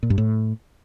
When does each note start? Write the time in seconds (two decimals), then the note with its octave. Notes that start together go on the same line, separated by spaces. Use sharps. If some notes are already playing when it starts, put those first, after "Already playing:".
0.03 A#2
0.10 G2
0.18 A2